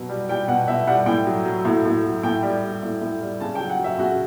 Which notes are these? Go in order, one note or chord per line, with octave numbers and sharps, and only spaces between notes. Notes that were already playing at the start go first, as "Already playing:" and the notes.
Already playing: B2 F#3
G3
G3 G5
B2 F#5
B2 E5
G3 F#5
A2 G5
F#3
F#3
A2
A2
F#3
A2 G5
G3
G3
A2
A2
G3
C#3 A5
G5
F#3
F#5
F#3
E5
C#3 F#4